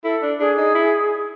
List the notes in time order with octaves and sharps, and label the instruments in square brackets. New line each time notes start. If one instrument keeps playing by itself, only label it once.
[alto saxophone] E4 [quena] A4
[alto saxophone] D4
[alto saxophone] D4 [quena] G#4
[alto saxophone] D#4
E4